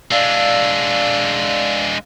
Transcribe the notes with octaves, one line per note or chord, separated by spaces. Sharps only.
G#3 D4 D5 F5 E6